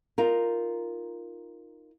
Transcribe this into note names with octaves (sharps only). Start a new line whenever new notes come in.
D#4 F4 A#4